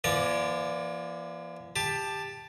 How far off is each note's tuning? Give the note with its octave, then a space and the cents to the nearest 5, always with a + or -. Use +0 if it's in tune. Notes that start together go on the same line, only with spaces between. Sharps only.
F3 -45 A#3 +40 D5 -5
G4 +20 A5 +0